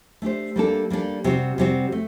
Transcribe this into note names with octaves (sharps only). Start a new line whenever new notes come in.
A3 D4 G4 C5
G3 A#3 D4 A4
G3 A#3 D4 A4
C3 G3 C4 F#4
C3 G3 C4 F#4
A3